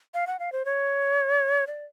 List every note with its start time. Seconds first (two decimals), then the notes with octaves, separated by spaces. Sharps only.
0.14 F5
0.27 F#5
0.39 F5
0.52 C5
0.65 C#5
1.67 D5